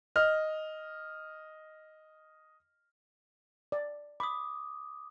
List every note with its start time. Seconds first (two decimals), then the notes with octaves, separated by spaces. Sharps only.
0.16 D#5 F6
3.72 D5
4.20 B5 D6 D#6